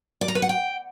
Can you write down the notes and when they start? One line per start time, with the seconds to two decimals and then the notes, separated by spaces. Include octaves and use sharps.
0.21 D5
0.28 A#5
0.35 B4
0.42 F#5
0.49 G5